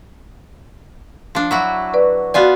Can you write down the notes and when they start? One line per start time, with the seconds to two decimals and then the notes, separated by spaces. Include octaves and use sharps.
1.35 F3 D4
1.51 F#3 E4 F#4
1.94 B4 D5
2.34 B3 F4 F#4 D5 G#5